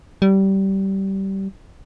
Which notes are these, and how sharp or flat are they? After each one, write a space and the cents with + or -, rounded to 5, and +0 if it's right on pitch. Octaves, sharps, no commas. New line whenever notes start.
G3 -20